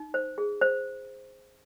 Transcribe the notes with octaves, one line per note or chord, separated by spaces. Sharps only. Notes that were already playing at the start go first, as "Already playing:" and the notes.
Already playing: D#4
C5
G#4
C5